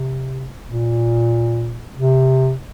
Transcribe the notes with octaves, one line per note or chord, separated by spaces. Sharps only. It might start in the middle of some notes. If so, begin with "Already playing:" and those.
Already playing: C3
A#2
C3